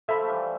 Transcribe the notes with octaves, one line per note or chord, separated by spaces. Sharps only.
F3 A4 E5 B5
A3
E3 G3